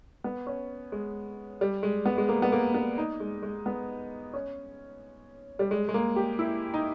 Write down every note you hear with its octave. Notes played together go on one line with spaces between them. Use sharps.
B3
C#4
G#3
G3
G#3
B3
G#3
A#3
B3
A#3
B3
D#4
G#3
G#3
B3
C#4
G3
G#3
G#3
A#3
G4
E4
D#4